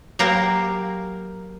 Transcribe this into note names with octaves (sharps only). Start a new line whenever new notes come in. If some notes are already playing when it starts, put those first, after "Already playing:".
F#3 A#3 G4 A#4 C5